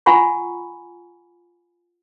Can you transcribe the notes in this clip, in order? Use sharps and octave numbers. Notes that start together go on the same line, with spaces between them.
F4 F#5 G#5 A#5 B5 C#6